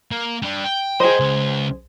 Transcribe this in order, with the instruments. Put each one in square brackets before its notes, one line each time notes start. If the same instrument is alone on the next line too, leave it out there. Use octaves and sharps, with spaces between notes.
[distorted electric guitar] A#3
G3 D4
G5
[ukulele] G#4 C5 [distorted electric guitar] D#5 G5
[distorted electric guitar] C#2